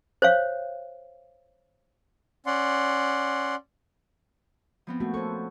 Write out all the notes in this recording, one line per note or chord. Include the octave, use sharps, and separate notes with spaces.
C5 C#5 F5
C#4 D5 F#5 C6
F3 B3 C4
A3 A#3 F#4
C#4 A4 C5 C#6